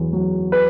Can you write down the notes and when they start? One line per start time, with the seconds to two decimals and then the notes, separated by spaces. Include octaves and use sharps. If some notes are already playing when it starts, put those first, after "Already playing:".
Already playing: E2 F#3
0.13 F#3
0.52 B4